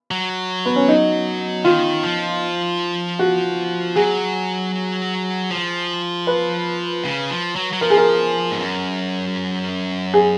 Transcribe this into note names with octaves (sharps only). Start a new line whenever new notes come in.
F#3
B3
C#4
D#4
D#3 F4
F3
F#4
F#3 G#4
F3
B4
C#3
F3
F#3
F#3
F3 A#4
G#4
A#4
G#2
F#2
G#4